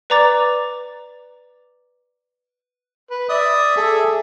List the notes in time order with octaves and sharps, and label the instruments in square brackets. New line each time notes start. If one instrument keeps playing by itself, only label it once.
[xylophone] B4 D5 A#5 D6 A6
[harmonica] B4
[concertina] D5 D#6 [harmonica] E5
[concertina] G#4 A4